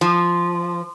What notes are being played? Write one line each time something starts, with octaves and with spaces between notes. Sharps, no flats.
F3